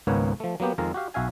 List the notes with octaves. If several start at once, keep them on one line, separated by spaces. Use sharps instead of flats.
G#1 C#2 G#2 A#3 B3 C#5
F3 A3
F#3 A#3 B3 G4
F2 D#3 G#3 F5 A#5
F#4 G4 F5
B1 F#4 E5 F5 G#5